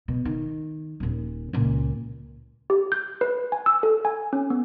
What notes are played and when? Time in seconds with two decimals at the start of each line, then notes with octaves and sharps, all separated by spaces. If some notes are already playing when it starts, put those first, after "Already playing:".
0.08 B2
0.25 D#3
1.00 D#1 A#2
1.53 C#2 A#2
2.70 G4
2.92 G6
3.21 B4
3.52 G#5
3.66 E6
3.83 A4
4.05 G#5
4.33 C#4
4.50 B3